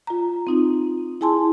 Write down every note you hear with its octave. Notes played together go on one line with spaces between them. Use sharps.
F4 A#5
C4 D#4 F4
E4 G#4 G#5 A5 C6